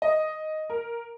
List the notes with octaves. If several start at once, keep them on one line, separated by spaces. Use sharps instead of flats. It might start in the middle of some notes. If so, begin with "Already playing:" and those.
D#5
A#4